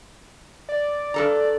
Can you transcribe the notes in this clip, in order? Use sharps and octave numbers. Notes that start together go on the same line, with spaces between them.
D5
G2 A4 A#5